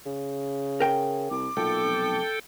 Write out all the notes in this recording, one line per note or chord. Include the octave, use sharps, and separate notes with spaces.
C#3
A#4 G5
C2 D6
B1 A#2 A4 G5
F1